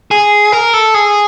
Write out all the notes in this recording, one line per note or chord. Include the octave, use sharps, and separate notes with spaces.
G#4
A#4
A4
G#4